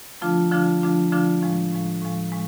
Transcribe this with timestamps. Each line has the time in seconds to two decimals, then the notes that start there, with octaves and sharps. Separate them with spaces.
0.21 D3 F3 A3 D4 F4
0.52 D3 F3 A3 D4 F4
0.82 D3 F3 A3 D4 F4
1.12 D3 F3 A3 D4 F4
1.42 A2 F3 G#3
1.72 A2 F3 G#3
2.02 A2 F3 G#3
2.32 A2 F3 G#3